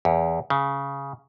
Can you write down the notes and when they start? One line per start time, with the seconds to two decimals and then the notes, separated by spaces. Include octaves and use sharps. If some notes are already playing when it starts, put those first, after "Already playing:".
0.05 E2
0.50 C#3